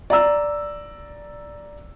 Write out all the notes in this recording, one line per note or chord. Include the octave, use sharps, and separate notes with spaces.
D5 A#5 E6